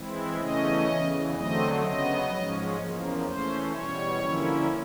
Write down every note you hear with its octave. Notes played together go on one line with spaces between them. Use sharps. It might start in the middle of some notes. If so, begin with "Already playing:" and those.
Already playing: E3 G#3 C4 E4
E2 C#3 E3 A3 C#4 D#5
E2 C#3 E3
D3 F#3 A3 C4 D#5
C#3 F#3 B3 D#5
G#2 F3 G#3 C#4
E2 C#3 F3 A#3
E3 A3 C#4 C5
E2 B2 G3 C#5
D3 F3 A#3 C#4 E4